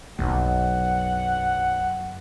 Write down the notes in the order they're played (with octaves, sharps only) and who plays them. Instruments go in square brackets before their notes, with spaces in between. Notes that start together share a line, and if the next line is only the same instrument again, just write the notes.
[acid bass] B1 [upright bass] F#2 [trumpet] F#5